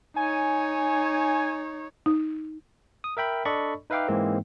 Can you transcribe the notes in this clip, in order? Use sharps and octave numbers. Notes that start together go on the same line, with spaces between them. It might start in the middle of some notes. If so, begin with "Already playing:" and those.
D#4 C#5 G#5
D#4
D#6
A#4 E5 G5 B5
D4 A4 D5 D#5 B5 C#6
D#4 B4 E5 F5 G5 D6
G#2 E3 G#3 A#3 C4 E4